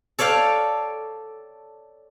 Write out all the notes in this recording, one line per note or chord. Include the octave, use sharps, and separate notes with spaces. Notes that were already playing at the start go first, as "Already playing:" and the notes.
A4 C#5 D5 F5 G5